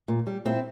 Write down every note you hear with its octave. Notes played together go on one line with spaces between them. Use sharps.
A#2
G3
A#2 C4 E4